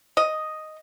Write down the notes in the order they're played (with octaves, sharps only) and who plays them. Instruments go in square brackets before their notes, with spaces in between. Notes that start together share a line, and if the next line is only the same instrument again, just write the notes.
[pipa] D#5